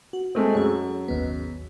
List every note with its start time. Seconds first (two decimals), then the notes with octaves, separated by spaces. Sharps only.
0.13 F#4
0.35 G#3 A3 C4
0.55 F#2 G#4 C#5
1.08 G#1 D#2 B3